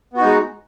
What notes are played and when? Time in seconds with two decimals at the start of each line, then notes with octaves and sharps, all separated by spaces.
0.13 B3
0.17 F#4
0.21 D#4
0.24 G#3